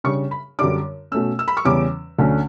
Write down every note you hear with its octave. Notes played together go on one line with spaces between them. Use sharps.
C#3 G3 D4 C#6
B5
F#2 D3 G3 D4 D6
B2 A3 C#4 E6
E6
B5
C#6
E2 C#3 G3 C#4 D6
D2 D3 A3 C#4